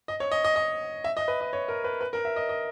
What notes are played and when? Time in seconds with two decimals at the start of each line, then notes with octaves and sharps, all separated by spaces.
0.08 D#5
0.20 C#5
0.32 D#5
0.44 D#5
0.56 D#5
1.04 E5
1.17 D#5
1.28 B4
1.41 D#5
1.53 C#5
1.68 A#4
1.84 B4
2.01 B4
2.13 A#4
2.25 E5
2.36 D#5
2.49 D#5